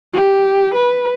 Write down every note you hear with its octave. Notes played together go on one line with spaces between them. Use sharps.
G4
B4